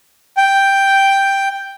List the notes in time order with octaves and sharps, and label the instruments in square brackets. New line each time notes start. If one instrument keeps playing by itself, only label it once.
[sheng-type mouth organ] G5